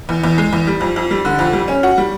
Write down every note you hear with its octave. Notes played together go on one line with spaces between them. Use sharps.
E2
E2
G#3
E2
G3
F2
F2
G3
D3
F2
G3
C#4
F#4
G3